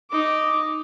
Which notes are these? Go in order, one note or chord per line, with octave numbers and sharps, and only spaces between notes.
D#4 D6